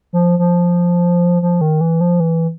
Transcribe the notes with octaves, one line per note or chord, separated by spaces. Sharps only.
F3
F3
F3
D#3
E3
F3
E3